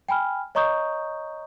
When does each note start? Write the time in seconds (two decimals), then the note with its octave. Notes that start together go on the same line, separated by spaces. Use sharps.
0.09 G5 G#5 B5 F6
0.55 C#5 D#5 A#5 C#6 D#6 G6